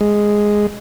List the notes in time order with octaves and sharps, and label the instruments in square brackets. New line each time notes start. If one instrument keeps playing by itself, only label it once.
[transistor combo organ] G#3